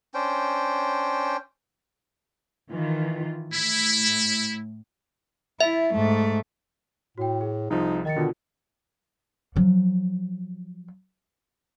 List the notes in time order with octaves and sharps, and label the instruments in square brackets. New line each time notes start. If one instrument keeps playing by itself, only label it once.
[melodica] C#4 D4 C5 G5
[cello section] D#3 E3 F4
[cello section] A2 [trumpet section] E4
[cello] E4 [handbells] E5
[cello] G#2 A3
[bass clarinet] A2 [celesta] F#4 G5
[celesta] G#4
[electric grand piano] C2 F3 [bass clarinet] D#4
[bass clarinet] D#3 [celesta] D#5 A6 C#7
[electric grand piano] B2 D3 [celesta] F4
[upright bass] F3 F#3